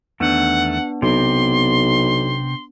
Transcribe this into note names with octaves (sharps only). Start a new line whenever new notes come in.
E2 D#3 A3 B3 D4 F#5
B1 C3 C4 C6